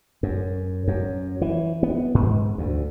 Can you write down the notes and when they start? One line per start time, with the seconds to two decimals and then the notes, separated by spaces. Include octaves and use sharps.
0.23 F#2
0.88 F#2
1.41 E3
1.83 B3
2.15 G#2
2.58 D2